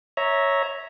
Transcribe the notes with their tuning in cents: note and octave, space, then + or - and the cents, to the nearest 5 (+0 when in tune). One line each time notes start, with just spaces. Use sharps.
C#5 +0 E5 -15 A#5 +0